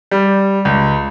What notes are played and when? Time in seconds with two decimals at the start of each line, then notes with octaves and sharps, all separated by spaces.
0.11 G3
0.65 C#2